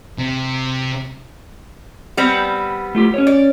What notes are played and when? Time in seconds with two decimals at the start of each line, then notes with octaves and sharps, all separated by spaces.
0.18 C3
2.17 G3 B3 C4
2.95 A3 F4 G4
3.14 C#4 C#5
3.27 D5